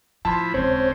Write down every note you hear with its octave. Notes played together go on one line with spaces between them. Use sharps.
A2 F3 E4 A5 B5 C6
D#1 C#2 C4 C#4 C5 C#5